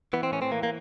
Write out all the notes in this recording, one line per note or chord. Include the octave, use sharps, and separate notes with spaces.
E3 B3
C4
A2 C#4
C4
E3 A#3
A#3